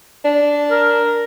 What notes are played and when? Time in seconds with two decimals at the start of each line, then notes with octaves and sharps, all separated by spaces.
0.25 D4
0.71 A#4